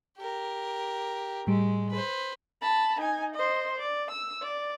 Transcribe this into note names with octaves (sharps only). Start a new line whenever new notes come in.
G4 A#4
A2 G3 G#3
B4 C5
A5 B5
D#4 G#5
C5 D#5
D5
E6
D5